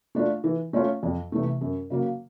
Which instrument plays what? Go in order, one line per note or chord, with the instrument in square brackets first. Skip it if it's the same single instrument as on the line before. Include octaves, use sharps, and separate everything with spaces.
[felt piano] A3 D4 F4
E3
A3 C#4 F4
F2
C3 E3 A3
F#2
C#3 F#3 A#3